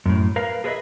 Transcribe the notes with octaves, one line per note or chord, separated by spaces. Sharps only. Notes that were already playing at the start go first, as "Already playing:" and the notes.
F#2 A2
A#4 B4 F5
G#4 A4 B4 C#5 D#5 E5